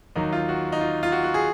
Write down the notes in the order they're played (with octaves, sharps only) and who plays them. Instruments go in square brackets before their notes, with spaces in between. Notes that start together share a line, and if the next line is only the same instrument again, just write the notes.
[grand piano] D#2 D#3 F#3 D#4
F4
F#4
D#4
F4
F4
F#4
F#4
G#4